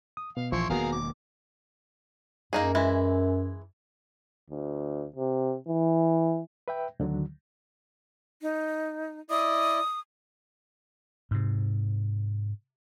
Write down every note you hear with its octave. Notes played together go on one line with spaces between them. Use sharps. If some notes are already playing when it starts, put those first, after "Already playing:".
D#6
B2 B3 F5
A#1 E3 F3 E4 C6 C#6
E1 D#3 A#3 B3 F#4 G#4 A#4 F5
D6
F#2 A#3 D#4 G#4
E3 G#3 E4
D2
C3
E3
B4 E5 G5
D2 D3 D#3 F#3
D#4
E4 D5 D#5 D#6
G#2 C3